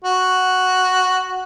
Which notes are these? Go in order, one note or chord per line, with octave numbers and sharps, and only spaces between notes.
F#4